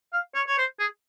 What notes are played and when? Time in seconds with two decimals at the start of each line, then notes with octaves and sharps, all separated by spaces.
0.13 F5
0.35 C#5
0.47 C#5
0.58 C5
0.79 G#4